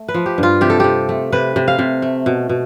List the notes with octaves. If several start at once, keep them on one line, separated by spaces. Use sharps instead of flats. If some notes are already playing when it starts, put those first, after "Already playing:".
Already playing: A3
B4
F3
G4
G2 F4
C3 G4
A4
C3 G4
A3
C3 B4
C3
F5
C3
A3
B2
B2